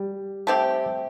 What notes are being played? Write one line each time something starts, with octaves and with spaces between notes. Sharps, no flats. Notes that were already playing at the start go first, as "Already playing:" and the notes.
Already playing: G3
A3 C4 G4